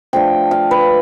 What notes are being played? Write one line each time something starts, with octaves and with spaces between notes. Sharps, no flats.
F3 A3 D4 G5
F5
B4